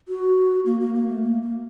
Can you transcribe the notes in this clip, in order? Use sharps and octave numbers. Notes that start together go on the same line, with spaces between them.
F#4
A#3
A#3
A#3
A3
A#3
A#3